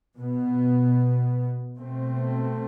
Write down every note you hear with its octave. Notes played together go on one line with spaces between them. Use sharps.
B2 B3
B2 A3 C4